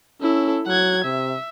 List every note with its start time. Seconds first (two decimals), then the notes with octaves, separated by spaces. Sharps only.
0.21 C#4 E4 A4
0.67 F#3 F#5 G#6
1.04 C3 E5